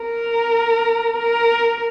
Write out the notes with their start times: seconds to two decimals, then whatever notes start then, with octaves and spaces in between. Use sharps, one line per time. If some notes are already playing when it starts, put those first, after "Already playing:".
Already playing: A#4
1.16 A#4